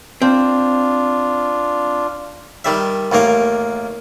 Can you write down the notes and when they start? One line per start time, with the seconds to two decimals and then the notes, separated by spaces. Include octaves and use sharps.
0.22 C4 D4 F4
2.65 D#3 G3 E5
3.12 A1 D#3 A#3 A#4